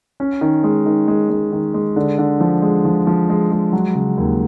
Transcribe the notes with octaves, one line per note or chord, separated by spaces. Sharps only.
C#4
D#3
G#3
D#3
G#3
G#3
D#3
G#3
D3
D3
F3
G#3
F3
F3
G#3
G#3
F#3
C#3
D#2